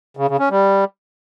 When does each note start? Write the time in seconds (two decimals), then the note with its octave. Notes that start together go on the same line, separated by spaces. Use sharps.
0.17 C#3
0.28 C#3
0.39 C#4
0.50 G3